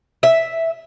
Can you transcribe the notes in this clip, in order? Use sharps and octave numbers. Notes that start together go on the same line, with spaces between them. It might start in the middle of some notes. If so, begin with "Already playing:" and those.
E5